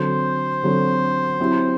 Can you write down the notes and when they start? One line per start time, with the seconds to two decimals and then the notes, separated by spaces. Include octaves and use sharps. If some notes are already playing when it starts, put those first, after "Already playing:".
Already playing: D3 F#3 C4 F#4 A4 C5
0.63 D3 F#3 C4 F#4 A4
1.40 F#3 C4 E4 G4